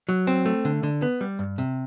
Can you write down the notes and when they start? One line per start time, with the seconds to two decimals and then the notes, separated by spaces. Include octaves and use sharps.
0.09 F#3
0.27 C4
0.46 A3
0.65 D3
0.83 D3
1.02 B3
1.21 G3
1.39 G2
1.58 C3